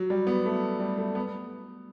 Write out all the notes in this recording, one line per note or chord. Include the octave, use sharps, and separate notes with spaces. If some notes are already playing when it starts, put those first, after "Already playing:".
Already playing: F#3
G3
B3
A3
G3
A3
B3